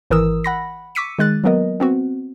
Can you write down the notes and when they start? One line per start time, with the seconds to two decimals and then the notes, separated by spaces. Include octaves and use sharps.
0.10 G#1 E3 A#4 D#6 E6
0.44 F#5 B5 A#6
0.95 C#6 D6 E6 B6 C#7 D#7
1.19 D#3 G#3 F#6 A6
1.44 F#3 A#3 B3 A#4 D#5
1.80 B3 C4 F#4